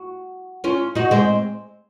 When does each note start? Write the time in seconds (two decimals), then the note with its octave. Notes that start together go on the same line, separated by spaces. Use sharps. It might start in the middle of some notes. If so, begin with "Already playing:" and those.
Already playing: F#4
0.64 C#4 F4
0.95 D#4 F#4
1.11 G#3 C4